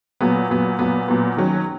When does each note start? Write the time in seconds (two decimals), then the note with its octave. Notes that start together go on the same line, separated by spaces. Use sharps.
0.21 A#2 F#3 B3
0.50 A#2 F#3 B3
0.79 A#2 F#3 B3
1.08 A#2 F#3 B3
1.37 D#3 F#3 C#4